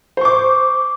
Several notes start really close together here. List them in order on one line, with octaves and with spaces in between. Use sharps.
C5 C#6 D6